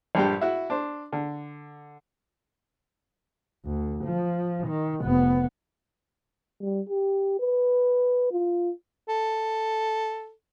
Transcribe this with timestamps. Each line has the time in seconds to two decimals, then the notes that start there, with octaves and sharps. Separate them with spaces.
0.15 A#1 G2 G3 G4
0.41 E4 F#4
0.70 D4 C5
1.13 D3
3.65 D2
4.04 F3
4.67 D#3
5.02 F1 B3
6.61 G3
6.89 G4
7.39 B4
8.32 F4
9.08 A4